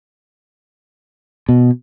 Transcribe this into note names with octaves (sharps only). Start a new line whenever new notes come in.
B2